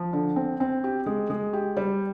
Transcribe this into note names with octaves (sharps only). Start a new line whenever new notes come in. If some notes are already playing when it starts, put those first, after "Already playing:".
Already playing: F3
D3
C4
C4
G4
G#3
G#3
G4
G3